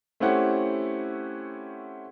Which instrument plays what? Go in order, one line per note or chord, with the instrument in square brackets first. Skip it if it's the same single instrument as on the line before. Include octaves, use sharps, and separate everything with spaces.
[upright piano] A3 C4 C#4 E4 G4 F#5